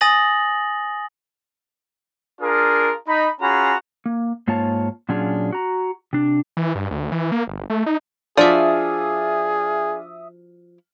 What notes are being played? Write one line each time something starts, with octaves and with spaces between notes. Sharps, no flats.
G#5 D#6 A6 A#6 F#7
D4 F4 G#4 A#4
D#4 B5
C#4 F4 F#4 G#4 A#5 B5
A#3
G#2 A#3 F4 C#5 A5
A#2 F#3 C#4 D4 F4 G#4
F#4 A#5
C3 D4
E3
G2
D2
E3
A#3
G1
A3
D#4
F3 D4 F4 F#4 G#4 D5 E5 D#6